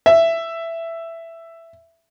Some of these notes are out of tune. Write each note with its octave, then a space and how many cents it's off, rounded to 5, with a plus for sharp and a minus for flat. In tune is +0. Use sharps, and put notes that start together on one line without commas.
E5 +10